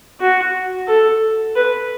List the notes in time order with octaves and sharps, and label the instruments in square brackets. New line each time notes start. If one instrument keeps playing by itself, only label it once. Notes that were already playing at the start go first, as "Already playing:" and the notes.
[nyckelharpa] F#4
A4
B4